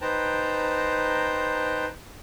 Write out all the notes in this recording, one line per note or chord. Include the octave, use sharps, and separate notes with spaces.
D#4 B4 C5 G5 A5 A#5